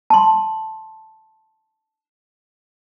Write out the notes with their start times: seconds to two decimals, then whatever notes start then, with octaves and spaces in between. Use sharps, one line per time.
0.10 A5 C6